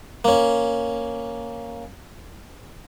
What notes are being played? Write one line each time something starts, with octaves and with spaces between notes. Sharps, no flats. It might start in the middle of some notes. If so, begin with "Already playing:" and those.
A#3 C#4